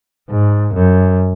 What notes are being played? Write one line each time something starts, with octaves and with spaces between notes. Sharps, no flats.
G#2
F#2